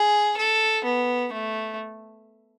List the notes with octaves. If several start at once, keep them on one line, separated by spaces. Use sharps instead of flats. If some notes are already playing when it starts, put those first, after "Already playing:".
Already playing: G#4
A4
B3
A3